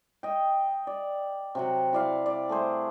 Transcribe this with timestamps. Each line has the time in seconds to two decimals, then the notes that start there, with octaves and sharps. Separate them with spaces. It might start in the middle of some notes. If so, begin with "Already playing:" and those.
0.23 D#5 G5
0.87 D5
1.55 C3 F#3 F#5
1.93 E4 D5 F5
2.26 D5
2.49 A3 G#4 C5